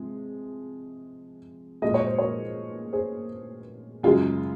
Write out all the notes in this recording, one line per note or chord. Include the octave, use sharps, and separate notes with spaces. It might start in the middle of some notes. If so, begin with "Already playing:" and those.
Already playing: C3 F3 G#3
A#2 G#3 D#5
C#5
C5
A#4 C#5
G#4 C5
F#2 C#3 G#3 F4 G#4